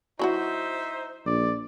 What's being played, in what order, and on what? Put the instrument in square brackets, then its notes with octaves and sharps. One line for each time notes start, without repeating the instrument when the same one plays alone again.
[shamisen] F#3 E4 F#4 [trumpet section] D#4 C5 E5
[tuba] A#1 [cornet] D5